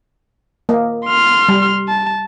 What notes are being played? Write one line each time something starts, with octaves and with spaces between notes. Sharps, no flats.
A#3 D#5
C6 F6
G3
A5